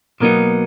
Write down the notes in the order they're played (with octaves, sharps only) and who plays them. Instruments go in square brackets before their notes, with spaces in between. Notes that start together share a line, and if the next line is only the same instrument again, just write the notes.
[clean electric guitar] B2 F#3 B3 D#4 [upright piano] A#3